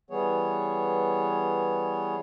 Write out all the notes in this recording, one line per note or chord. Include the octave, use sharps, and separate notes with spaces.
E3 G3 B3 G#4 C#5